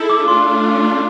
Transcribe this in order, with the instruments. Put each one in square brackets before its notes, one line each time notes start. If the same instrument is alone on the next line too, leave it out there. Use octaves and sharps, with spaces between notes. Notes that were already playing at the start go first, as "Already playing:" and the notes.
Already playing: [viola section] E4 A4
[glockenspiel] D6
[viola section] A3 D4 F4 [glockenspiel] C6